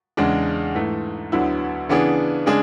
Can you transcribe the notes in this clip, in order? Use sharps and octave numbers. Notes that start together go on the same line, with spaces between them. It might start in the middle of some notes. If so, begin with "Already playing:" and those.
E2 C#3 G#3 D4
G#2 E3 A3
D2 D3 F#3 B3 E4
C#3 E3 B3 D4 G#4
C#3 G#3 D4 G#4